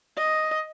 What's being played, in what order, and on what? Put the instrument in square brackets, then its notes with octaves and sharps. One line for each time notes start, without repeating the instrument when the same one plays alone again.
[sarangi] D#5